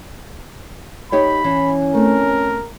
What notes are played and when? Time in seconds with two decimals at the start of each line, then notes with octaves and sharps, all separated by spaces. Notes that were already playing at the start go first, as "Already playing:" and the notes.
1.12 D#4 G4 C#5 B5
1.44 E3 C#4
1.94 A3 C4 A#4